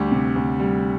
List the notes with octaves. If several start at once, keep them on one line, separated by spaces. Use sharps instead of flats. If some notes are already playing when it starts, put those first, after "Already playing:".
Already playing: D2 G3 G4
C3
D2
G3